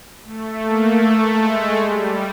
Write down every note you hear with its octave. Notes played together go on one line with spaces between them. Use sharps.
A3
A#3
A3
G#3
G3